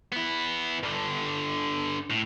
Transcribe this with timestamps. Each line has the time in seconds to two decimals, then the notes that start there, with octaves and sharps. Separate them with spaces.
0.13 B3 E4
0.83 G2 D3
2.10 A2